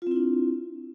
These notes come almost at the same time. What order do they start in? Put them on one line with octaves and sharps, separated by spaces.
F4 C4 E4 D4